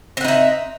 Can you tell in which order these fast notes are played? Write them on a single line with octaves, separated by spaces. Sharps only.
C4 F#5 D#4 E5